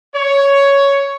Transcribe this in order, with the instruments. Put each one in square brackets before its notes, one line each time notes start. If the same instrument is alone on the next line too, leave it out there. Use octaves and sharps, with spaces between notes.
[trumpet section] C#5